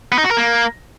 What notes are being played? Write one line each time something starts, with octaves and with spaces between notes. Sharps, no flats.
B3
D#4
F#4
A#4
A#3